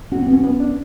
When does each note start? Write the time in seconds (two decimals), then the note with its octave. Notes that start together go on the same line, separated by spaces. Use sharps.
0.12 C#4 F#4
0.22 C4
0.28 B3 C#4
0.44 B3 C#4
0.60 D4